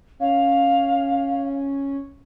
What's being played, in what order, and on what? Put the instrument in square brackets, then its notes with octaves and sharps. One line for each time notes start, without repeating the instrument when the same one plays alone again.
[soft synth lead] C#4 [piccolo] F5